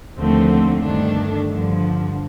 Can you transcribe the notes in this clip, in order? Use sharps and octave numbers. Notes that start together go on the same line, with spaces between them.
D#2 D3 F3 A3 C4
G1 G2 D#3 A3 D4
G2 D3 F3